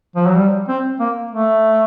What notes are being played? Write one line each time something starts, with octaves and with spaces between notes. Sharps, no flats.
F3
F#3
G3
C4
A#3
A3